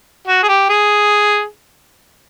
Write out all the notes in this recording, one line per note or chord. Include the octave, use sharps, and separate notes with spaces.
F#4
G#4
G4
G#4